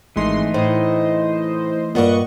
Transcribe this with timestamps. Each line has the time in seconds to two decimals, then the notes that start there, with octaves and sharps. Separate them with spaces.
0.16 G#1 E3 G#3 A3 D#4 C6
0.54 A2 C5 D#5
1.95 E2 G2 A#2 D#5 F#5 C#6